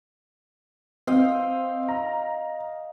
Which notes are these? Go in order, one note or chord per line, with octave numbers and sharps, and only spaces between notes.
C4 D#5 F5 G5
A#5